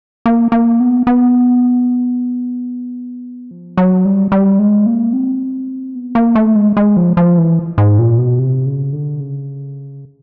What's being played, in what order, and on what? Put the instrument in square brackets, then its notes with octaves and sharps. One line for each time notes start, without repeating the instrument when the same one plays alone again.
[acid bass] A#3
A#3
B3
B3
F3
F#3
G3
G3
G#3
A#3
C4
B3
A#3
A3
G#3
G#3
F3
F3
E3
G#2
A#2
B2
C3
C#3
D3
C#3